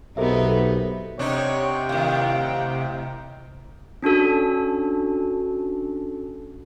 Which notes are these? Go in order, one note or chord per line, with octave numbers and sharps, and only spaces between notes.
B1 C3 B3 D#4 A4 A#4 E5
C3 D4 D#4 C#5 F#5 G5
A2 D#3 F5
C#4 D4 F#4 A4